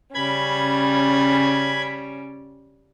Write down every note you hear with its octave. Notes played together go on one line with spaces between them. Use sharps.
C#3 G3 C#4 B5 G#6